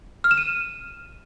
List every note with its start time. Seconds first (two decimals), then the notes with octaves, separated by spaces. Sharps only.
0.24 F6
0.31 E7
0.38 D#7